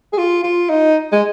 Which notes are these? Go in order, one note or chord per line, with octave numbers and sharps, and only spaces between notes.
G#4
F4
F4
D#4
G#3